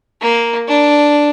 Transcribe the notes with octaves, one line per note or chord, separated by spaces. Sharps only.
A#3
D4